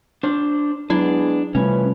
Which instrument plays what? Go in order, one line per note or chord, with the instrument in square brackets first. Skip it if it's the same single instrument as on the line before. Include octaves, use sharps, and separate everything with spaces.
[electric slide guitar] D4 C5
[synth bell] F#3 E4 [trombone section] G#3 B3 [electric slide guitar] D4
[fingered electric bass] C3 G3 A3 [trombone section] E3 F3 B4 [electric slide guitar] C#4